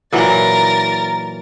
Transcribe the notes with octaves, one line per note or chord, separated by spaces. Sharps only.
A#2 E3 F#3 A#4 A6